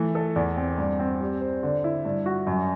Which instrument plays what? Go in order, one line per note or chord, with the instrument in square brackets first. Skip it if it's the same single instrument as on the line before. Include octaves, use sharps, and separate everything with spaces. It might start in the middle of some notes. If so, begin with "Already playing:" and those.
Already playing: [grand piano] E3 A3
A4
E2
C4
G2
C4
G3
C5
D3
E4
G2
F#4
F#2